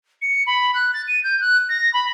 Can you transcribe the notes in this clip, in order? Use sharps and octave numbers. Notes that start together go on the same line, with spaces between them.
C#7
B5
F#6
A6
D#7
G6
F#6
A#6
B5